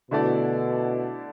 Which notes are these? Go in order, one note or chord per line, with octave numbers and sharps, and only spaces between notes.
B2 D3 A3 E4 A4 D5